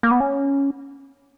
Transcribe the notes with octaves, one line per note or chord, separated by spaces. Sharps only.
A#3
B3
C#4